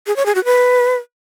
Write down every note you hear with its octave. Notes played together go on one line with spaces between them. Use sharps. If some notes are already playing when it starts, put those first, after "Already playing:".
G#4
C#5
G#4
F#4
B4